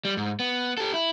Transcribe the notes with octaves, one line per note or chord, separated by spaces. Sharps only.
G3
G#2
B3
G4 A4
E4